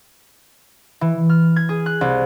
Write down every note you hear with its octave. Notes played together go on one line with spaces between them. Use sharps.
E3
F6
G#6
G#4
F#6
C2